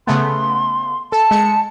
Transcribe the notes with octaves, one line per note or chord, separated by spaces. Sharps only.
C#3 A3 B3 C6
A4 A5
G#3 C#7